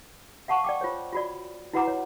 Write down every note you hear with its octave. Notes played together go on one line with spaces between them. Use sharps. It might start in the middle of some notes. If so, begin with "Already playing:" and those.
F5 F#5 A5 C#6
D5 G5 D6
F4 C5 C#5
F4 F#4 D5
E4 F#4 B4 F#5 A#5 D6
C#5